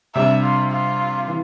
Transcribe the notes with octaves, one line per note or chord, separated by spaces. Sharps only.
C3 G3 D4 E5
F4
F4
E3